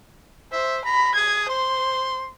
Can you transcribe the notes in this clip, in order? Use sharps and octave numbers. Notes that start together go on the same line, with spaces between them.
C5 E5
A#5 B5
G#4 G#6
C5 C6